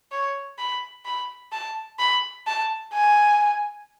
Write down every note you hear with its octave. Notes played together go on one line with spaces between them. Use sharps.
C#5
B5
B5
A5
B5
A5
G#5